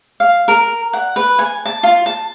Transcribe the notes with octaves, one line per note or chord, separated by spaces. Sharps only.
F5
A#4
F#5
B4
G#5
A5
F4
A5